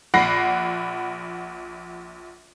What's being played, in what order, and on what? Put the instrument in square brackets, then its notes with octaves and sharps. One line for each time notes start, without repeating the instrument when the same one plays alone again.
[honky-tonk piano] A#1 F#5 B5 A#6 C7